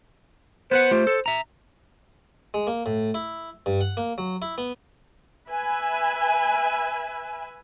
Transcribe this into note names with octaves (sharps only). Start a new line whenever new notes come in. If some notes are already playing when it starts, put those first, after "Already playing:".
B3 B4 C5 F#5
A3 F4 G4
A4
E5 A#5
G#3
A#3
A2
E4
G2
F#5
A#3
F#3
E4
B3
B4 E5 G#5